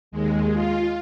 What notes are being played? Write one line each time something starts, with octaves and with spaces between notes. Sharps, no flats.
D#2 G#3
F4